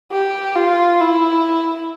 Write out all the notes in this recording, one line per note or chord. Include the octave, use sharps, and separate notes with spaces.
G4
F4
E4